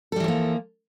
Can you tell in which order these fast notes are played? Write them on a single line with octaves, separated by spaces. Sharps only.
A4 G3 E3 F3 A#3